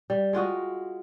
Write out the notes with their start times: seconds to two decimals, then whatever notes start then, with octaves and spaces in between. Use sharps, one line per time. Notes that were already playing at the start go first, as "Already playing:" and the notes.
0.10 G3
0.33 G#3 F4 F#4 D#5